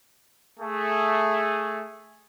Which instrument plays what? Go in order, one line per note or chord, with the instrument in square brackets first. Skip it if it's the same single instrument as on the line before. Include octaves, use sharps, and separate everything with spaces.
[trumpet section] A3 G#4